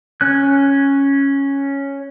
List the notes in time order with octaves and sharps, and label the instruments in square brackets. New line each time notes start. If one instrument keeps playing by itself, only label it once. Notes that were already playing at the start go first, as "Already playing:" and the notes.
[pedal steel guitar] C#4 F#6